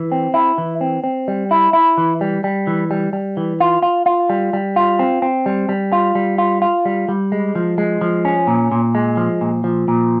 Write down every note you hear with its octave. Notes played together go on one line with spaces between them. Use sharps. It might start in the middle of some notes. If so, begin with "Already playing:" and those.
Already playing: E3
C4
E4
E3
C4
C4
G3
E4
E4
E3
G3
G3
E3
G3
G3
E3
F4
F4
F4
G3
G3
F4
C4
C4
G3
G3
F4
G3
F4
F4
G3
G3
G#3
F3
G#3
F3
C#4
A#2
A#2
G#3
F3
A#2
F3
A#2